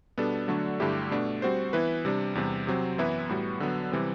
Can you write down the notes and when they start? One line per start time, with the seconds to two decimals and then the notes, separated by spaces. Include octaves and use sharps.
0.18 B2 G3 B3 D4 A4
0.48 D3 F#3 A3 D4 F#4
0.80 G2 D3 A3 E4 G4
1.11 B2 A3 D4
1.42 G3 C4 F#4 C5
1.73 E3 B3 E4 B4
2.05 C3 G3 D4
2.35 E2 C3 G3
2.67 C3 F#3 C4
2.98 F#2 E3 B3 E4 B4
3.29 A2 G3 B3 F#4
3.60 D3 F#3 B3
3.92 C3 E3 G3 C4